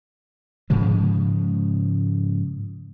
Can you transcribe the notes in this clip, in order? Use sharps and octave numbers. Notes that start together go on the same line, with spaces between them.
G#2 C#3 F3 G#3